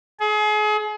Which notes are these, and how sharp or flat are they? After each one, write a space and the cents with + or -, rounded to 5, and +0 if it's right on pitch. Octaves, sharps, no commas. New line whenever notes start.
G#4 +35